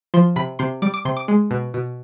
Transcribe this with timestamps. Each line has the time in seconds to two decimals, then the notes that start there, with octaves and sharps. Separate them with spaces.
0.14 F3 C6
0.36 C3 B5
0.59 C3 C6
0.82 G3 D6
0.94 D6
1.05 C3 C6
1.17 D6
1.28 G#3
1.51 B2
1.74 B2